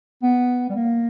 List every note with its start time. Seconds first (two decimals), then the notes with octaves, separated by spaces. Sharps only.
0.23 B3
0.69 G3
0.76 A#3